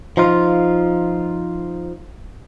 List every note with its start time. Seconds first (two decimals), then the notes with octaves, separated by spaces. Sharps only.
0.17 F3 D#4 F4